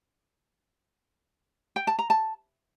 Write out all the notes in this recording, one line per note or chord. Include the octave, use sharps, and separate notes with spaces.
G5
A5
A#5
A5